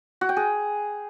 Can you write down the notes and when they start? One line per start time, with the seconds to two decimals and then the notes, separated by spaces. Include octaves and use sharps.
0.21 F#4
0.29 G5
0.37 G#4